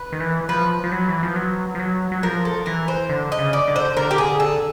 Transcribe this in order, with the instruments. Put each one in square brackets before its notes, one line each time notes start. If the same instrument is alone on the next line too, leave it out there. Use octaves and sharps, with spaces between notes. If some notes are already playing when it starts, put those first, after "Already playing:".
Already playing: [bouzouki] B4
[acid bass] D#3
E3
[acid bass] F3 [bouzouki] B4
[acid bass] F3
F#3
E3
F3
F#3
F3
F#3
F#3
[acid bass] F3 [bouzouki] A#4
[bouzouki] A4
[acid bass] E3 [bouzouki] A#4
[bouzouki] C5
[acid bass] D3
[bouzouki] D#5
[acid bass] C#3
[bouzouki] D5
[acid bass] D3
[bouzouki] C5
[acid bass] D3 [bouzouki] A#4
[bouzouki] G4
G#4
A4